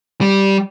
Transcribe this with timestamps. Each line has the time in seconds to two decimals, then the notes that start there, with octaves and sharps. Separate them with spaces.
0.21 G3